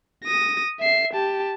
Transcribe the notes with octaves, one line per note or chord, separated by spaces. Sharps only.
D#6 A#6
E5 C7
G4 A5